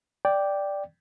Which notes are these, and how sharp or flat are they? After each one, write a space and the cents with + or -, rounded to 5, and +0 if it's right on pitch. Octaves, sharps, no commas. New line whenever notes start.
D5 +0 G5 +0